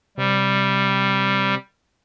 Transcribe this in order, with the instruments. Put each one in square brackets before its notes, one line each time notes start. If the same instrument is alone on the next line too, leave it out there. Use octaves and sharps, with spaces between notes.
[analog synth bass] C3 [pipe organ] G3